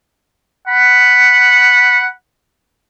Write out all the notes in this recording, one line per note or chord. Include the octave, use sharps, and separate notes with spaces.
F#5 B5